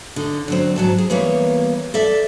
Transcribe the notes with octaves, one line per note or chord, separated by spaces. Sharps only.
D3 D#4
D3 F#3 C4
G#2 F#3 A5
G#4
E3 G3 A#3 B3 C#5
A4 D5 E5